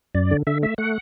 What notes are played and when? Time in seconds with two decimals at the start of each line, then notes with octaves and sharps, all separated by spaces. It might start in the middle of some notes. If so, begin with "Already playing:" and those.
0.15 F#2 D5
0.31 D3
0.47 D3 E5
0.63 A3 E5
0.78 A3 F#5